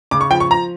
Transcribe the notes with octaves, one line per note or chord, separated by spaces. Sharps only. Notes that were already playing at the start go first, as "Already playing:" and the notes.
C#3 D6
C#6
F3 G5
C#6
F3 A#5